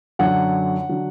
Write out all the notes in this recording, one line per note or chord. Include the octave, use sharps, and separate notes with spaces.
F#2 D3 F#3 F#5
D3 F#3